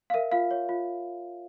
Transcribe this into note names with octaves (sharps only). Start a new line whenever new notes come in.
F5
A#4 E5
F4 F5
C#5
F4